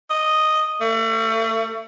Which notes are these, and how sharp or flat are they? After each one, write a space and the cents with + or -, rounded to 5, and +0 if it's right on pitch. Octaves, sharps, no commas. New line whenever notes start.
D#5 -5
A3 +35